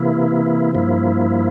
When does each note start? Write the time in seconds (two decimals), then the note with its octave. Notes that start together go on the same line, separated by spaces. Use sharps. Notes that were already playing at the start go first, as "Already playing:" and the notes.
Already playing: C3 E3 A#3 E4
0.75 G2 F3 A#3 E4